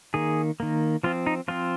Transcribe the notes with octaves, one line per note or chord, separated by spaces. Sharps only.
D#3 A#3 G#4
D#3 A#3
F3 C4 F4
D#4
F3 C4 F4